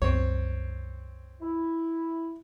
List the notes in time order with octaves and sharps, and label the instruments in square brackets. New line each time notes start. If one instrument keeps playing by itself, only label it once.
[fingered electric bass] C2 F#2 [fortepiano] C4 C#5
[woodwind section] E4